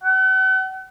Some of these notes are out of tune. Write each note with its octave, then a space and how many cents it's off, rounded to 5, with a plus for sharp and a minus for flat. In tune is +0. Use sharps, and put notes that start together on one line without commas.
F#5 +40